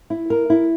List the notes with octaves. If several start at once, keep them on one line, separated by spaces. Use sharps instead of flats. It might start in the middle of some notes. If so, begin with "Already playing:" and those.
E4
A#4
E4